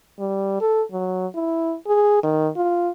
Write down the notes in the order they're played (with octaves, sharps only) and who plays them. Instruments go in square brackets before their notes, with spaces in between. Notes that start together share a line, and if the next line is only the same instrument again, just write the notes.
[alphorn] G3
A4
F#3
E4
G#4
D#3
F4